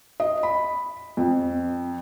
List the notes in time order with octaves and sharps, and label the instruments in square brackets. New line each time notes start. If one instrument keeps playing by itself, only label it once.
[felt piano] D#5
B5
F2